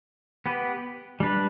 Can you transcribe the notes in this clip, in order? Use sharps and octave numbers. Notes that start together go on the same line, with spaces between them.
B3 G4 B4
G3 D4 B4